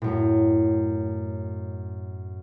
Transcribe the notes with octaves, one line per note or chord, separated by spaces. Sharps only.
F#2 A2